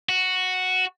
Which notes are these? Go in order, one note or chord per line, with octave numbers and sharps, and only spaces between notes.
F#4